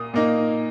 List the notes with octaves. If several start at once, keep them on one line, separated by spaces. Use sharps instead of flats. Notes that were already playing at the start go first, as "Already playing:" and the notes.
Already playing: A#2 A#3 D#6
A#2 A#3 D#4